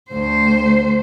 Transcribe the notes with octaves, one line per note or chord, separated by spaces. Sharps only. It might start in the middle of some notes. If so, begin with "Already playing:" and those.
D2 C5